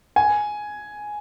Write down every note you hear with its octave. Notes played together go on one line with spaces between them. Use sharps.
G#5